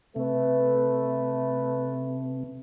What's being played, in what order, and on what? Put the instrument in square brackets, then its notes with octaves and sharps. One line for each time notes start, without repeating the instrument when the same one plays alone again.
[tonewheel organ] C3 [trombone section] A3 B4